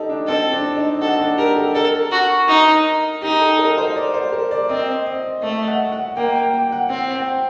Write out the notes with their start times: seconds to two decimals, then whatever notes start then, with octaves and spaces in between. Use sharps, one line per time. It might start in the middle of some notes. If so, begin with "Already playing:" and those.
Already playing: D#4 G4 A4 D#5
0.09 D4
0.28 C4 A4
0.53 D4
0.77 D#4
1.01 F#4 A4
1.20 D4
1.38 G4 A#4
1.57 A4
1.75 A4 A#4
2.12 F#4
2.49 D#4
3.22 D#4 G4
3.41 A4
3.59 A#4
3.78 C5
3.96 D5
4.14 C5
4.32 A#4
4.51 D5
4.69 C4 D#5
5.06 D#5
5.43 A3 D#5
5.68 F#5
5.92 F#5
6.17 A#3 G5
6.35 G5
6.53 G5
6.72 F#5
6.90 C4 F#5
7.15 G5